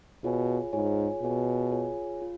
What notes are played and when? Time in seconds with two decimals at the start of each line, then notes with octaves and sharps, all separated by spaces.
0.24 B2 F4 G#4 C#5 G#5
0.73 G#2 F4 G#4 C#5 G#5
1.22 B2 F4 G#4 C#5 G#5
1.72 F4 G#4 C#5 G#5
2.22 F4